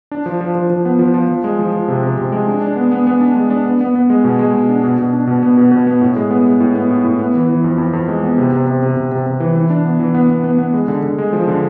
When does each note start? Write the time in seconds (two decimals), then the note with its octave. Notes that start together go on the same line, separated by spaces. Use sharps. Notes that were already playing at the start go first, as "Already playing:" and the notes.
0.11 D4
0.26 F3
0.41 F3
0.55 F3
0.70 F3
0.85 B3
0.99 F3
1.14 F3
1.29 F3
1.44 G#3
1.59 F3
1.73 F3
1.88 C3
2.03 C3
2.18 C3
2.32 G#3
2.47 D4
2.62 D4
2.76 B3
2.92 B3
3.07 B3
3.21 D4
3.36 G#3
3.50 D4
3.66 B3
3.81 B3
3.95 B3
4.10 G#3
4.24 B2
4.39 G#3
4.54 B2
4.69 D4
4.84 B2
4.98 B2
5.13 D4
5.27 B2
5.43 B3
5.57 B2
5.72 B2
5.87 B3
6.01 A2
6.16 G#3
6.31 B3
6.46 G#3
6.60 A2
6.75 B3
6.91 A2
7.05 A2
7.19 B3
7.34 E3
7.49 E3
7.64 F2
7.78 F2
7.93 F2
8.08 G#3
8.23 B3
8.38 C3
8.52 C3
8.67 C3
8.82 C3
8.97 C3
9.12 C3
9.26 C3
9.40 E3
9.56 E3
9.70 D4
9.85 B3
10.00 E3
10.14 B3
10.30 B3
10.44 B3
10.59 B3
10.74 G#3
10.88 D3
11.03 D3
11.18 G#3
11.33 F3
11.48 D3